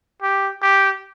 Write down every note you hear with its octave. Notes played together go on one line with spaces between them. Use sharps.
G4
G4